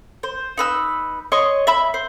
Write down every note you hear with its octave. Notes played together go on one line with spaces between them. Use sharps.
C5
D#4 B4 E6
C#5 D#5 C6 C#6
E5 B5 E6
C5